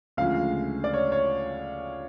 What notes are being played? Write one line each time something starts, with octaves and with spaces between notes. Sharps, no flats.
D2 C#3 F3 G#3 F5
D5
C#5
C#5